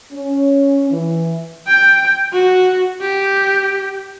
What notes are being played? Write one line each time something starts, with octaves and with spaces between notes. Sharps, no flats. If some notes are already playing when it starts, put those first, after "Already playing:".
C#4
E3
G5
F#4
G4